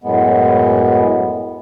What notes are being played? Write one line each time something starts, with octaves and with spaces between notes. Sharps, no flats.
F#2 A2 G#3 B3